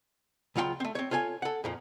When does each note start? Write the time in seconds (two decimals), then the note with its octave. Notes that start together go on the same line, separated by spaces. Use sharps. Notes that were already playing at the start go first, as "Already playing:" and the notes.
0.56 C#2 F#3 F4 F#5 G5 C6
0.80 A3 C4
0.95 C4 C#5
1.11 F4 A4 C#5 F5 G#5
1.42 A4 F#5
1.64 F2 A#2 F3